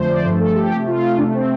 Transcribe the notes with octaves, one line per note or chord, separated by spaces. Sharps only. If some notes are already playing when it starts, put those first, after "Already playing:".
Already playing: F2 D3 F3 A3 C5
D5
G2 F3 A3 C5
A4
G4
C3 A3 G4
F4
F4
C3 A3 D4
C4